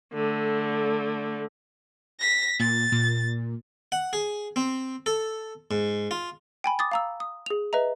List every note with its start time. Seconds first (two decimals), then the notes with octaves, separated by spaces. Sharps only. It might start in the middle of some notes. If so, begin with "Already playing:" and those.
0.13 D3 A3
2.20 A#6 B6
2.60 A#2 A6
2.92 A#2
3.92 F#5
4.13 G#4
4.56 C4
5.06 A4
5.71 G#2
6.11 F4
6.64 G5 G#5 B5
6.79 D6 D#6 A6
6.91 F5 A#5 E6
7.20 D#6
7.46 G#4 F7
7.73 B4 D#5 E5 A#5